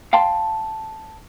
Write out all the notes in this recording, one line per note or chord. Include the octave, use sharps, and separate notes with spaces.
F5 G5 A5 C6